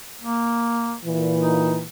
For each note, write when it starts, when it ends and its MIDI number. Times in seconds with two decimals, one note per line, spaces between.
0.22 0.96 58
1.05 1.84 46
1.05 1.84 52
1.39 1.79 63